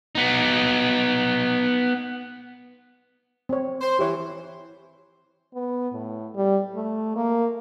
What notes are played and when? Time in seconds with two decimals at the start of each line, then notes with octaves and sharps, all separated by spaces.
0.15 B3 D#4
3.49 C4 C#5
3.81 C5
3.99 E3 G4 C#5
5.54 B3
5.93 A2
6.35 G3
6.76 A3
7.16 A#3